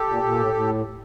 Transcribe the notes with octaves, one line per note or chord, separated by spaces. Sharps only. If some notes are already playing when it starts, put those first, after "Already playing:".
Already playing: G4 A4
A#2
A#2
A2
A2